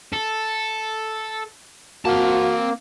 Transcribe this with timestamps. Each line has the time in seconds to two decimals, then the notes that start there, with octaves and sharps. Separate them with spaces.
0.13 A4
2.05 A#3 C4 F#4 A5